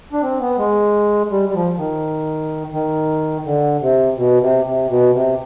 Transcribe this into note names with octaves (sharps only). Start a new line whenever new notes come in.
D4
C4
B3
G#3
G3
G3
F3
D#3
D#3
D3
C3
B2
C3
C3
B2
C3